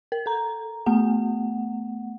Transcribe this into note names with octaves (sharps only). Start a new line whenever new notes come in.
A#4
A4 A#5
A3 B3 F#5